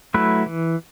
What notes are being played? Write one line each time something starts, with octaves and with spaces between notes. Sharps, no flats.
F#3 A3 E4 B4
E3